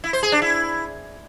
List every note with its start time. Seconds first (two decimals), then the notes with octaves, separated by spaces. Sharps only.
0.04 E4
0.13 C5
0.23 G#4
0.32 D4
0.42 E4